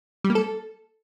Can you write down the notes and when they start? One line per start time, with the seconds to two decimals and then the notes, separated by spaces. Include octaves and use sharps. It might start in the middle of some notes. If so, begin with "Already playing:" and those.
0.24 G3
0.30 A#3
0.35 A4